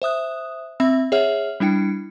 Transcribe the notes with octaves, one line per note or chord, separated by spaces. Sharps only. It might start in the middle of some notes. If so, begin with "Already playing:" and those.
C5 E5 D#6 F#6
C4 E5 B5 E6
G#4 C#5 E5 F#5 F6
G3 D4 E4 G5 C#7